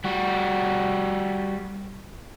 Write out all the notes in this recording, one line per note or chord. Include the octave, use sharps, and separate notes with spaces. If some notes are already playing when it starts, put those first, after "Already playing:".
G3 F#4